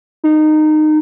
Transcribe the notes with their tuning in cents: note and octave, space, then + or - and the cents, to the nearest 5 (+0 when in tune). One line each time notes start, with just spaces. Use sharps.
D#4 -20